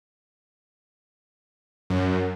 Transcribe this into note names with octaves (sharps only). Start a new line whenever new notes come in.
F#2